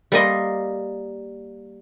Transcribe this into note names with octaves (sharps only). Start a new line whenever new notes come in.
G3 A#3 D#5 C6